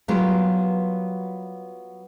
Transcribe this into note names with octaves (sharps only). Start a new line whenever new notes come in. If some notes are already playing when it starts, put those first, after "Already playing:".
F#3 G3 B3 F4 G4 A#4